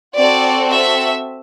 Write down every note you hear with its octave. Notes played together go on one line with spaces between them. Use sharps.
C4 F#4 A4 D5
E5